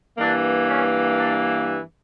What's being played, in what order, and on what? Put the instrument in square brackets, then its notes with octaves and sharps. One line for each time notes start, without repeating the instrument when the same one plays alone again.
[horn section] G2 E3 A#3 D4
C#4
D4